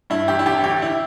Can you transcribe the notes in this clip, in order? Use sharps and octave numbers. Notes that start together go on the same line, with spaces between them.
G2 E4
A1 G4
E4
A1 G4
D2 G4
E4